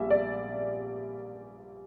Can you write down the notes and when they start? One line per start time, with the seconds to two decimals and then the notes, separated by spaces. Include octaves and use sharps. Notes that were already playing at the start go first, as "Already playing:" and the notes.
Already playing: A#1 G3 E5
0.10 D5